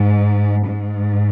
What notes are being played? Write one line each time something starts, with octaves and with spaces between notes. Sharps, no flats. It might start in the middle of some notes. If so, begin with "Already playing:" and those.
Already playing: G#2
G#2